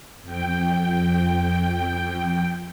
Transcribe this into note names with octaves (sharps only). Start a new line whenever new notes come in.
F2 G5